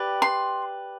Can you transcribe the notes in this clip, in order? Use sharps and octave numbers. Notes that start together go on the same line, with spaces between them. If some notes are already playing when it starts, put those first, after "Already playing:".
Already playing: G4 B4 D5
C6